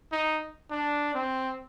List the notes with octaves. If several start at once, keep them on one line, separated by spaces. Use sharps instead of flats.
D#4
D4
C4